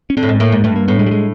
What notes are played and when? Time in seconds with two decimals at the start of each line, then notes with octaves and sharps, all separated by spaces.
0.10 C#4
0.17 D3 C4
0.23 A2
0.29 G#2
0.40 A2 A#3
0.52 G#2
0.64 G2 A3
0.76 A#3
0.88 A2 B3
0.99 G#3
1.06 G3
1.11 G#3